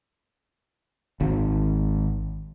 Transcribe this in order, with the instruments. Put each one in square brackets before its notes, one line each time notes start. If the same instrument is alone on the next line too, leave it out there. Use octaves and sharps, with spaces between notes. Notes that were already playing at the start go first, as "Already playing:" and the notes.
[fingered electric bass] G#1